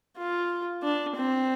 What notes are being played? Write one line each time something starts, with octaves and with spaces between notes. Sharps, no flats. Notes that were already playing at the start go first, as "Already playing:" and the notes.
F4
D4
C4